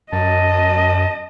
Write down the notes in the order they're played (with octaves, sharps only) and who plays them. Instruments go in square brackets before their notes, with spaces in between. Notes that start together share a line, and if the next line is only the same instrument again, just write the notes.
[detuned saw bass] F#2 [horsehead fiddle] D#5 [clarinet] A5